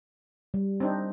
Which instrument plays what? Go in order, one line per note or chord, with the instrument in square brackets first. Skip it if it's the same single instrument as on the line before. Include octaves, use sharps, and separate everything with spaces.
[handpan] G3
[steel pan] C4 D4 D#4